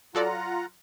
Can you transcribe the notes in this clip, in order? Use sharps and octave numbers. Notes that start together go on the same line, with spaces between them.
F#3 F4 A4 D5 F#5 A#5